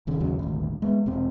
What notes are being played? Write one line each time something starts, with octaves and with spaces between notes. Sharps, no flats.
D#1 D#2 C#3
G1 D#2 C#3 F#3
D#1 G#1 D2
G#3 B3
E1 C3 C4